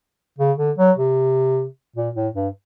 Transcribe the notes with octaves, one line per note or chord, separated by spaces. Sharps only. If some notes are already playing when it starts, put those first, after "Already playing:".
C#3
D3
F#3
C3
A#2
A2
G2